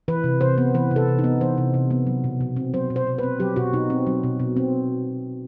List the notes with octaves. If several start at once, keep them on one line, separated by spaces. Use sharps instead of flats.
E3 B4
C3
C3 C5
B3
E3 B4
C3
A4
C3
D#4
B3
E3 C5
C3
C3
B3
F#3
B2
B2
C4
F#3 C5
B2
C5
B2
C4 B4
F#3 G4
B2 F#4
B2 D#4
C4
F#3
B2
B2
C4